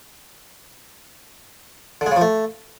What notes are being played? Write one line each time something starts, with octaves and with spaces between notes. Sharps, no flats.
D3
G#3
C#3
F3
A3